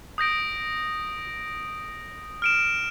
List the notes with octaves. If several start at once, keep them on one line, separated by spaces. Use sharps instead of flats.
D#6 G6 A#6 D7
F6 D7 E7